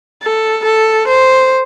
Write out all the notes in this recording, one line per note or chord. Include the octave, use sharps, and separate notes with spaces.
A4
A4
C5